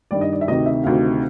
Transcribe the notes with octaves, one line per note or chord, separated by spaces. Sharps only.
G2 D#3 G3 D5
D#5
D5
E5
D2 C3 D#3 D#5
E5
D2 C3 D#3 F5